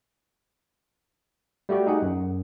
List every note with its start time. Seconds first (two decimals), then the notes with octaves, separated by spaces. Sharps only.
1.69 G3 A3 F#4 G4
1.87 D#4 G#4 F#5
2.02 F#2